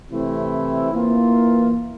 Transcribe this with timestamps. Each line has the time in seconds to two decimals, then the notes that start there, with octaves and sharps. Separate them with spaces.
0.10 C3 E3 A3 C4 E4
0.91 E3 A#3 F4